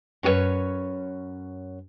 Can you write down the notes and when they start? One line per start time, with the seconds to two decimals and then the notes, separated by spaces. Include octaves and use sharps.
0.23 F#2 C#4 F#4 B4 C#5